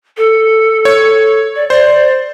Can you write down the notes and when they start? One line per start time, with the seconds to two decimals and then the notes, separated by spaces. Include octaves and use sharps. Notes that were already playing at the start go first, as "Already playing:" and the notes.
0.18 A4
0.85 C#5
1.56 D5
1.70 C5 D5